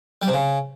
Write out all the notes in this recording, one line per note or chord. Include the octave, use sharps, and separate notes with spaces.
G3
C3
C#3